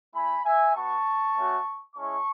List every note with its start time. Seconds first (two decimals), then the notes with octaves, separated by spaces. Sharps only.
0.15 A3 E4 G#5 B5
0.45 E5 G#5
0.75 B3 F#4 A5 C#6
1.36 A3 C#4 F#4
1.95 G#3 C#4 E4 A5 C#6